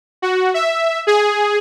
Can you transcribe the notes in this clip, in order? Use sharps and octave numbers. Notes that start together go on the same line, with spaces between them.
F#4
E5
G#4